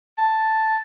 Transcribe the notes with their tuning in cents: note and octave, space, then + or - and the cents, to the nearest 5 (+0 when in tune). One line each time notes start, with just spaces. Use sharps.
A5 +0